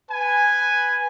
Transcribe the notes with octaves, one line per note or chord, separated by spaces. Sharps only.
B4 G#5